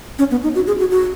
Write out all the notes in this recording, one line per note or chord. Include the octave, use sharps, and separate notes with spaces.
C#4
B3
D#4
F#4
G#4
F#4
F#4